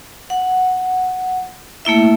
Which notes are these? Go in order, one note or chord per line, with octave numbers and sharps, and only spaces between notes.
F#5
A3 A#3 E4 E5